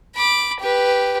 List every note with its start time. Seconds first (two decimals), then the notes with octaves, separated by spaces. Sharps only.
0.16 B5 D6
0.60 G4 B4